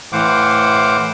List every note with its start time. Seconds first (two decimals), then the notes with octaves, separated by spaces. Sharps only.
0.13 A2 E3 C5 F5 F#5 D6